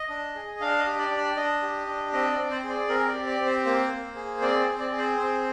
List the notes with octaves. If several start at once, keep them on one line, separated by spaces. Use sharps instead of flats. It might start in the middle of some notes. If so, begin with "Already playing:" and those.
Already playing: D#5
D4
G#4
D4 F5
D#5
G4
D5
D4
D5
D4 D#5
G4
D4
C4 D#5
D5
C4
C5
G#4
D5
C4 A#4
D5
G4
D5
C4
C5
A#3 C5
A#3
G#4
C4 D5
C5
C4
D5
G#4
C5
C4 C5